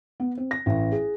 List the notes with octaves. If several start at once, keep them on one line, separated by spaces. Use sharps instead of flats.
B3
C4
A#6
A1
G#4